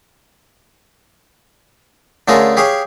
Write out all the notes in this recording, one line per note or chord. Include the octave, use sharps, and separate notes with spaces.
D3 A3 C#4 F4 G#4 A#4
G4 G#4 C#5 F5